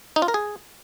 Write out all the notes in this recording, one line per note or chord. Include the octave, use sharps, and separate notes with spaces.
D#4
F4
A#4
G#4